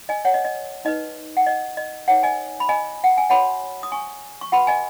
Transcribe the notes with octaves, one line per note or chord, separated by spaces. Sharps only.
D#5 G#5
C#5 F#5
D#5
D#5
D#4 B4 D#5
F#5
D#5
D#5
D#4 B4 C#5 F#5
D#5 G#5
B5
D#5 G#5
F#5
G#5
F#4 C#5 F#5 B5
D#6
G#5 C#6
C#6
F#4 B4 F#5 B5
D#5 G#5